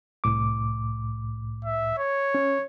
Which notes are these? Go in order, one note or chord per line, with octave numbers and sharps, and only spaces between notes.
C2 A2 D6
E5
C#5
C#4